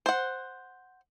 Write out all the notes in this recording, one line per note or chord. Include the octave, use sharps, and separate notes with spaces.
C5 F#5